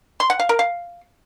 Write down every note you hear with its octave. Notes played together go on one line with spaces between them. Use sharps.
C6
F#5
F5
A#4
F5